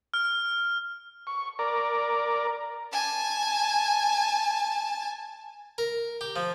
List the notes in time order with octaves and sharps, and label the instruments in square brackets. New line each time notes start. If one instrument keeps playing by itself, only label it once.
[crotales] F6
[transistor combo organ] C#6
A#4 D5
[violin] G#5 A5
[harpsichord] A#4
G4
F3